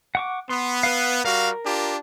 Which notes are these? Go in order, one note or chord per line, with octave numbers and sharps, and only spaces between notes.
F#5 C#6 D6
B3 C6
B4 F5
G3 F#4 A#4 F5
D4 F4 G4